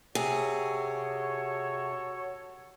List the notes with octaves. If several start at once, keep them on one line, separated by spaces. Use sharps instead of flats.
C3 F#4 G#4 A4 C#5